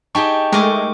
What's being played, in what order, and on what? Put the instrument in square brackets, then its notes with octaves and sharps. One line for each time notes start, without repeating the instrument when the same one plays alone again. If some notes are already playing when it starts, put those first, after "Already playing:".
[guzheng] D#4 G4 G#4 [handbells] G5 A5 C#6
[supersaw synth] G#3 A3 [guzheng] A#4 D#5 [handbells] G5 C#6 D6